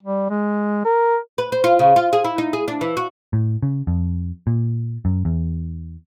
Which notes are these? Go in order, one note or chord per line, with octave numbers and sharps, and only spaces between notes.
G3
G#3
A#4
B4
C5
F4
C#3
F4
G#4
E4
D#4
G#4
D4
E3
F#4
A2
C#3
F2
A#2
F#2
E2